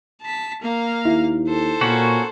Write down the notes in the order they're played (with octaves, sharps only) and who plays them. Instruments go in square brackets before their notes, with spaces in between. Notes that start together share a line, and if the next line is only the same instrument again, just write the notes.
[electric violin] A5 B6
A#3 F5
[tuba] D#2 [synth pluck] E4
[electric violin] A4 C5
[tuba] A#2 [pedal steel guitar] A#3 C#4 F#4